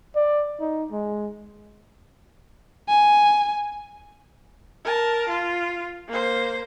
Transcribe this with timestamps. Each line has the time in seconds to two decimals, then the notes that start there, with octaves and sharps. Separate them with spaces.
0.16 D5
0.60 D#4
0.91 G#3
2.89 G#5
4.84 A#4 A5
5.29 F4
6.08 A#3 C5